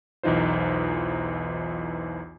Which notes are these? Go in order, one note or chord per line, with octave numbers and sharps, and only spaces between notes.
B1 E2 E3 D#4 F4 C5